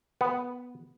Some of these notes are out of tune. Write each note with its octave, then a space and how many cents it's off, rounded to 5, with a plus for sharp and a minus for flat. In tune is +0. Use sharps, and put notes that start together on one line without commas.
B3 +0 F#5 +0